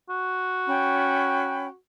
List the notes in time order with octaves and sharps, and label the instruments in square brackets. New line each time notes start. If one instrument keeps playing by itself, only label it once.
[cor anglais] F#4
[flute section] C#4 G5 B5